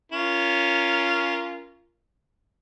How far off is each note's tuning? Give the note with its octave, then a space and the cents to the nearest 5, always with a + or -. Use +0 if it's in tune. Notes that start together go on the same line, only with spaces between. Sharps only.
C#4 +10 F4 -20 A#4 +0